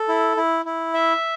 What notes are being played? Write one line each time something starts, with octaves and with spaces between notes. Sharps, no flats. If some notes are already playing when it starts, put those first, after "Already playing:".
Already playing: A4
E4
E4
E4
E5